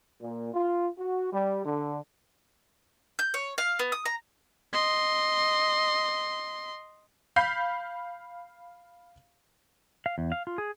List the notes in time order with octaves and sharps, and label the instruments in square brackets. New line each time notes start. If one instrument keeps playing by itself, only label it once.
[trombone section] A#2
F4
F#4
G3
D3
[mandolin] G6
C#5
F5
B3
D#6
A#5
[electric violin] D#5 C6
[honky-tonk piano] F5 B5 G6 B6 C7
[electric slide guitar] F5
E2
F5
F4
G#4